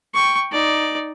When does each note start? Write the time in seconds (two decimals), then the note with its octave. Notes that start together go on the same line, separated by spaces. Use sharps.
0.14 G5 C#6
0.52 D#4 D5